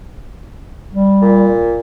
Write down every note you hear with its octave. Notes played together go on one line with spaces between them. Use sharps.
G3
A#2